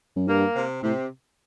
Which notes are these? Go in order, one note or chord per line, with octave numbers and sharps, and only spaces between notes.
F#2
G2 A#3
C3
A2 C3